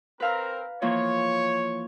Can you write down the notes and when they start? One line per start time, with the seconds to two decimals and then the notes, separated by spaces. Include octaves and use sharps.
0.20 C4 A#4 B4 F5 A#5
0.82 E3 F3 A#3 C#5